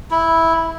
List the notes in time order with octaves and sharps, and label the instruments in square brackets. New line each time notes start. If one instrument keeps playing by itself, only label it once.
[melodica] E4